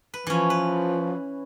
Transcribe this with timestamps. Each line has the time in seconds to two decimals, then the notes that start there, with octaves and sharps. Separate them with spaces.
0.14 B4
0.27 E3 F3 C#4
0.50 B4